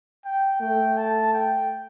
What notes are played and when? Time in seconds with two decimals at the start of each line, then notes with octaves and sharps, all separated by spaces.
0.25 G5
0.61 A3 G5
0.97 A5
1.34 G5